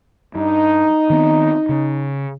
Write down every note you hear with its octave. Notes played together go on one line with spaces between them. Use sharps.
G2 D#4
D#3 B3 C4
C#3 C#4